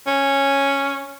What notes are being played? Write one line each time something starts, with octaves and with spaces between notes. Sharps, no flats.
C#4